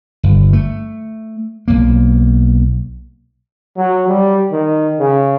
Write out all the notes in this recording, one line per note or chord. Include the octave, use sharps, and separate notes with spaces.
G1
A3
B1 A#3
F#3
G3
D#3
C#3